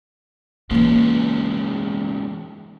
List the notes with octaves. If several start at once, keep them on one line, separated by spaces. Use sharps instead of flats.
E2 E3 G#3 A#3 C#4